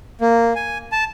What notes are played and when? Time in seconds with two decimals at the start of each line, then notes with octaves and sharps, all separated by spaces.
0.21 A#3
0.55 G#5
0.92 A5